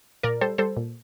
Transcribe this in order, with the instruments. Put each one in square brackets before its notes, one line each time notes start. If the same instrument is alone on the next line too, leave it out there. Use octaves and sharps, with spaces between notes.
[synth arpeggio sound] A#2 A#4 D5
G3 A4 C5
G3 A4 C5
A#2